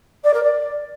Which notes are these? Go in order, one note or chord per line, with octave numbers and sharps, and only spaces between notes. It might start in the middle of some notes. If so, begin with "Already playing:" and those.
D5
A#4
D5